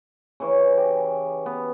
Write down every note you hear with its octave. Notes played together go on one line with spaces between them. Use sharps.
C#3 E3 C#4
G4
B3